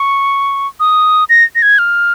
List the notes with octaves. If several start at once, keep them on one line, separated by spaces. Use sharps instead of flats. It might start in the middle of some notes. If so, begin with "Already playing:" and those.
Already playing: C#6
D#6
A#6
A#6
G#6
F6